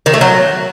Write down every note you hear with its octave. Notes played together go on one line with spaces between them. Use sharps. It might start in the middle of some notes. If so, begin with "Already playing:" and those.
D#3
A3
F#3